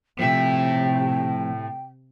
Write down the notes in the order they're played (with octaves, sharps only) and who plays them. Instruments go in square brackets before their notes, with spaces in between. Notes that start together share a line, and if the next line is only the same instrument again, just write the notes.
[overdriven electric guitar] A2 E5 [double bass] C3 [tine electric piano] F3 A3 C4 [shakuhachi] G5